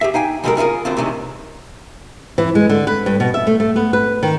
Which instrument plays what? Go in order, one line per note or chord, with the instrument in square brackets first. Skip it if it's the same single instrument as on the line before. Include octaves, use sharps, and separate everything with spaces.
[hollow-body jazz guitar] G4 G#4 E5
D#4 F5 G5 G#5
C#3 G3 G#3 G4 A4 A#4
C#4 E4 F4 G#4 A#4
F#2 D3 C4 F4
C3 D#3 E3 G#3 C#4
[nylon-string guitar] E3
G#3
D3
B4
G2
B2
E5
A3
A3
B3
B4
D#3